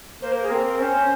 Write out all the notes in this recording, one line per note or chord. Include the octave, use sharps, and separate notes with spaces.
A#3 C5
A#4
G#4
C4 A#4
C#4 C5